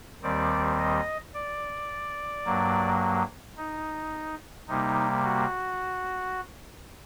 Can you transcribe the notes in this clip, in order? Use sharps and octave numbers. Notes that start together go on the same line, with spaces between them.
D#2 D#3 G3 C4 D5
D#5
D5
G2 F#3 A#3
D#4
C3 G3 A#3 D#4
F#4